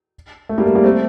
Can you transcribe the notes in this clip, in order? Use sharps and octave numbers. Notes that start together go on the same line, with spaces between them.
A3
G3 A#3
A3
G3 A#3
A3 C4